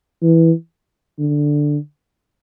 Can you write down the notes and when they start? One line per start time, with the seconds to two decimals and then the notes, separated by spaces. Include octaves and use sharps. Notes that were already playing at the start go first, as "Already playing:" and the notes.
0.22 E3
1.19 D3